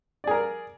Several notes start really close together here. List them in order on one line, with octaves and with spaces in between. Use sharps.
D5 G#4 A#4